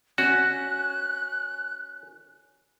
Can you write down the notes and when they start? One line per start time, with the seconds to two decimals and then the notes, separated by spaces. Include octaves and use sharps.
0.18 C#4 F#4 F#6